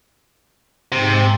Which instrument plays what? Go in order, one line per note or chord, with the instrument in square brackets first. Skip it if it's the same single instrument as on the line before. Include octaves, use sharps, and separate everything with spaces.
[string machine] G#2 G5 A6 [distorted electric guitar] C3